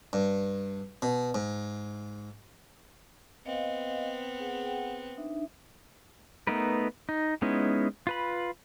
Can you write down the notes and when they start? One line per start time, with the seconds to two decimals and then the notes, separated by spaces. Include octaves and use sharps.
0.13 G2
1.02 B2
1.35 G#2
3.46 B3 C4 D#5 F5
4.40 G#4 F#5 G5
5.17 D4 D#4 E5
6.47 A3 B3 D#4 A#4 B4
7.09 D#4
7.42 G#3 B3 C#4 D#4 E4
8.07 F4 B4 B5